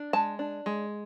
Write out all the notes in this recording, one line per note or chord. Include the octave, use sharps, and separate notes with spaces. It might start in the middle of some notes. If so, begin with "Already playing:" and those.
Already playing: D4
G#3 A5
D4
G#3